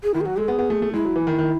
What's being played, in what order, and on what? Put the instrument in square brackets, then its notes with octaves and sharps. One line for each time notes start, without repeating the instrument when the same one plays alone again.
[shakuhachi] G#4
[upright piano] D#3 [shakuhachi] E4
[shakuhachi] G#4
[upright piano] F#3 [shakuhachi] F#4
[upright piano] G#3 [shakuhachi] A4
[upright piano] B3 [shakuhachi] G#4
[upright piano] B3
A3
A3
[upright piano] G#3 [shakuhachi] E4
[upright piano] F#3
E3
D#3
D#3